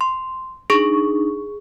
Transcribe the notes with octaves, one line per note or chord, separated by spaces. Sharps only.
C6
D4 D#4 G#4 C#6